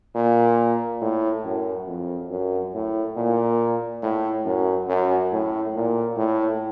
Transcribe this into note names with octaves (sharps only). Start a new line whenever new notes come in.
A#2
A2
F#2
F2
F#2
A2
A#2
A2
F#2
F#2
A2
A#2
A2